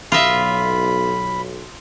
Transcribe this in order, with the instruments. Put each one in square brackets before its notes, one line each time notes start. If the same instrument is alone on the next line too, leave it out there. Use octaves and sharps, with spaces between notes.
[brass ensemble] B1 [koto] F4 D#5 E5 [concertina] B5